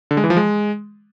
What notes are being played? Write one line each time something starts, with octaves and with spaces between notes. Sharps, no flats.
D3
G#3
E3
F3
G#3